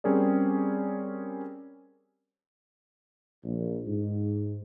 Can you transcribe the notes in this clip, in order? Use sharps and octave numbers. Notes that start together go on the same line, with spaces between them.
G3 C4 C#4 G#4 A#4 D5
A#1
G#2